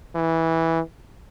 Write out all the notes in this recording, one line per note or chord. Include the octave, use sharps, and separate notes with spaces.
E3